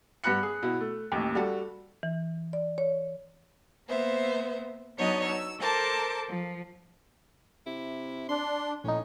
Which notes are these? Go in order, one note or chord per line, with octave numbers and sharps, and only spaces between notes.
G2 B3 B5 F#6 C#7
G#4
B2 E4
A3
A1 D#2
G3 F#4 A4
E3
D5
C#5
A#3 B3 C5 E5
F#3 B3 D4 D#4 C#5 D#5
E6
A4 A#4 C5 A5 D6
F3
C3 E4
D4 C6
A#1 A2 C#4 D#4